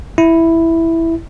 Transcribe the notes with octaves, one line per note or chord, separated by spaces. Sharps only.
E4